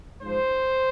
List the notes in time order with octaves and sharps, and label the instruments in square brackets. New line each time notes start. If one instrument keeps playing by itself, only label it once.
[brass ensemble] G#2 F3 C5